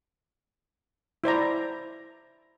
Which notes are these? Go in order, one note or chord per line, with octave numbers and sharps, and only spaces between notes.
E4 C5 D5 A#5